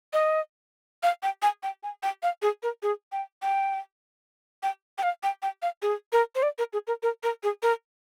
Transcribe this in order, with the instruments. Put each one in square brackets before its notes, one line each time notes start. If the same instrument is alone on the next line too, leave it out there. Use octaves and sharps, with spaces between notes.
[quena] D#5
F5
G5
G#5
G5
G#5
G5
F5
G#4
A#4
G#4
G5
G5
G5
G5
F5
G5
G5
F5
G#4
A#4
C5
D5
A#4
G#4
A#4
A#4
A#4
G#4
A#4